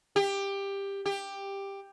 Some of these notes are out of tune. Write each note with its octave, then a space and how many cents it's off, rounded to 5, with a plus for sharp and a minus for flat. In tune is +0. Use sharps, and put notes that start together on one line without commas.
G4 +15
G4 +10